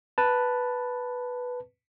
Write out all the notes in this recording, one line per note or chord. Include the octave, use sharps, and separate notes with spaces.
B4 A5